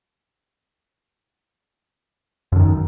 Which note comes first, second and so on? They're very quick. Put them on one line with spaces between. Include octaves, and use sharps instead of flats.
F#2 D3 D#3